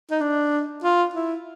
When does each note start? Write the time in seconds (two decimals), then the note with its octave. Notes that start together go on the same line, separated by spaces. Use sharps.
0.11 D#4
0.21 D4
0.84 F4
1.14 E4